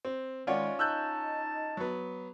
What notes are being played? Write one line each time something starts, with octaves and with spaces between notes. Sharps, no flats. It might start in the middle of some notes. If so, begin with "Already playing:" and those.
C4
D#3 G#3 C#4 F4 C#5 D5 F#5
D#4 A5 E6 F#6 G6
F#3 B3